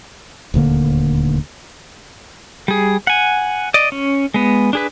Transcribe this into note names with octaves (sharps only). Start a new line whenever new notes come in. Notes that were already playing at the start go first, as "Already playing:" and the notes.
D#1 D2 D3 A#3
G3 G#4
F#5 G#5
D5 D#5
C#4
G#3 B3
D4 G#4 B4